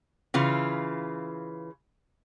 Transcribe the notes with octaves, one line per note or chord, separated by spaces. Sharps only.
C#3 E3 F4